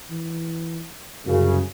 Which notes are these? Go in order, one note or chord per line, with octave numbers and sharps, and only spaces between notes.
E3
C2 F#2 C#3